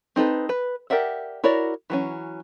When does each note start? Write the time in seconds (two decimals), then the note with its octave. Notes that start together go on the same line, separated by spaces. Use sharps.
0.16 C4 D#4 A4 B4
0.49 B4
0.90 G4 A#4 D5 E5 F#5
1.44 E4 F#4 A#4 C#5 D5
1.90 E3 F#3 C#4